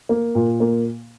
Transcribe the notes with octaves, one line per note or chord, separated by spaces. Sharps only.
A#3
A#2
A#3